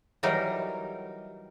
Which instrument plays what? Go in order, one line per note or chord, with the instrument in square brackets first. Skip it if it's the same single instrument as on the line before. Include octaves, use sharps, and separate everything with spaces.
[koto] E3 F#3 G3 D#4 A#4